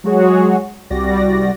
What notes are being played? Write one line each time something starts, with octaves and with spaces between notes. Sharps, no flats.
F#3 G#3 F#4 G#4 C#5
C2 G3 F#4 D5 A#6